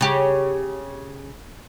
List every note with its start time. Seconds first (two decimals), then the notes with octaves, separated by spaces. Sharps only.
0.01 C#3 G4